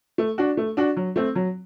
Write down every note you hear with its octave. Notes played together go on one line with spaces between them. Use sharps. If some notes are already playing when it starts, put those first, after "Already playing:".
A3
D4 F#4
A3
D4 F#4
F#3
A3 C4
F#3